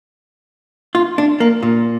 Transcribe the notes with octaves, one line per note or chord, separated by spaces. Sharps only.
F4
D4
A#3
A#2